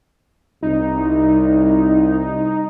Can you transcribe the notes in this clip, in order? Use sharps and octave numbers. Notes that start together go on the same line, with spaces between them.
C2 D#4